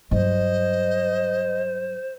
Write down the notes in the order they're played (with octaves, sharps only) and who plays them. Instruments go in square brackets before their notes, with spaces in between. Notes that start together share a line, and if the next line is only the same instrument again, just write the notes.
[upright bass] G2 F#3 [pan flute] C5 [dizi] D#5